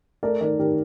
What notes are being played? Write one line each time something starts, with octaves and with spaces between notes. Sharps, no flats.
A3 A#4 D5
D#3 A#4 D5
D#3 G4 A#4